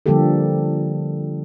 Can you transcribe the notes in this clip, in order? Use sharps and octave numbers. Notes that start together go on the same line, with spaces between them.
D3 F3 G3 A#3 G4 A4